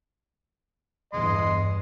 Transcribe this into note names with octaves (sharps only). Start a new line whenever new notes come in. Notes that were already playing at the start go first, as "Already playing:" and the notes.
E2 G2 D#5 C6